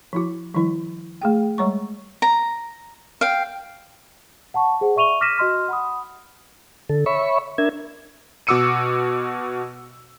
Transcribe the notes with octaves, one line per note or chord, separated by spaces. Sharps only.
F3 E4 F#4
D#3 F3 G3 E4
A3 G#4 G5
G3 G#3 C#5 F#5 A#5 C#6
A#5
F5 G5
F#5 A5 C#6
G#4 C5 F#5
D5 E5 C#6 D#7 F7 G7
D6 F6 A#6 B6 D#7 E7
F#4 D#5 C6 F6
F#5 B5 D#6
D3 A4
C#5 E5 B5 C#6
D4 A#4 E5 G#6
B2 F#4 D6 E6 C#7 D#7